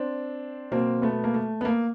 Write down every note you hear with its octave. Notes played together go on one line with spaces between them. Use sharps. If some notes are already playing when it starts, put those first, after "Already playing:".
Already playing: C4 D4
B2 F#3 A#3 C4
A3 B3
A#3
A3
B3
A#3